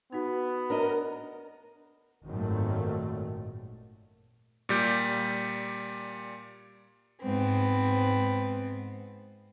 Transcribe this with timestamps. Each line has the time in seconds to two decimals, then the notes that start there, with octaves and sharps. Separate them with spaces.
0.12 B3 D#4 F#4
0.70 D4 A#4 D#5
2.28 G#1 F#2 A#2 D#3 F#3 A3
4.69 A#2 G3 G6
7.23 G#2 B3 C4